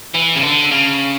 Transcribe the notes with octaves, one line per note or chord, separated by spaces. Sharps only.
E3
C#3
D3
C#3